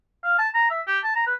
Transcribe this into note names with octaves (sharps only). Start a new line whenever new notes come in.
F5
A5
A#5
E5
G4
A5
A#5
B4